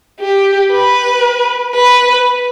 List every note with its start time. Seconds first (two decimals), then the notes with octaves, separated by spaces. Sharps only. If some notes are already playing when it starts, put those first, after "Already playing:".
0.21 G4
0.72 B4
1.75 B4